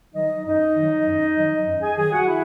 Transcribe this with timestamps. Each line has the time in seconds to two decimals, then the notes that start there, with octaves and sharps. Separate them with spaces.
0.14 D#3 F#3 D#4 D#5
0.44 F#2 D#4 D#5
0.75 D#3 F#3
1.06 F#2
1.36 D#3 F#3
1.66 F#2
1.81 G#4 G#5
1.96 D#3 F#3 G#4 G#5
2.12 F#4 F#5
2.27 E4 E5